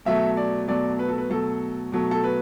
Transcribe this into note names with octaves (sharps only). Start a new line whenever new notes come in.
B2 F#3 A3 E5
D5
B2 F#3 A3 D5
B4
A4
B4
B2 F#3 A3 A4
B2 F#3 A3
A4
B4